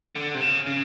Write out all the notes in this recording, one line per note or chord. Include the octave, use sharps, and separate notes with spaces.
D3
C3
C#3
C#3